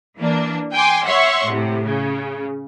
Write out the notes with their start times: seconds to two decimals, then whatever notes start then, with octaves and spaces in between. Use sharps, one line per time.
0.18 E3 A#3 D4
0.74 G5 G#5 C6 D6
1.06 C#5 E5 F#5 C6 C#6
1.49 A2 C3
1.84 C#3